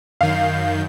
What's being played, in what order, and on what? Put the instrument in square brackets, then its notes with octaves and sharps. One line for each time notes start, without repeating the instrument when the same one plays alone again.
[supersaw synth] F#2 D#3 G6 [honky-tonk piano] F5